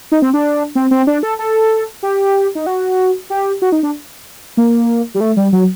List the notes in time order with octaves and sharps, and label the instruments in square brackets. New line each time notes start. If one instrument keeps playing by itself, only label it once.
[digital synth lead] D#4
C4
D4
C4
C4
D4
A4
A4
G4
D#4
F#4
G4
F#4
D#4
D4
A#3
G3
A3
G3
F#3